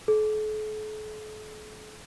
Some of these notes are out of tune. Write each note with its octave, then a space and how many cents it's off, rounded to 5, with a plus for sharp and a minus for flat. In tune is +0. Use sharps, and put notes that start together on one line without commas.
A4 -45